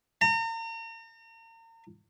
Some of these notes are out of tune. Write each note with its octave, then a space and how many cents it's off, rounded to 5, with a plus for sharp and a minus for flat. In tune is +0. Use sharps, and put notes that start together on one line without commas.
A#5 -40